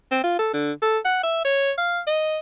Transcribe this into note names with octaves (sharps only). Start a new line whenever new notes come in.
C4
F4
A4
D3
A4
F#5
E5
C#5
F5
D#5